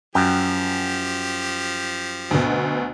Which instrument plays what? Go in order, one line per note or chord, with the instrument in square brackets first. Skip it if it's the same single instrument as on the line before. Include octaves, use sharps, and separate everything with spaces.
[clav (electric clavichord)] F#2 G5 [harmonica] F3 G4
[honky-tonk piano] D2 B2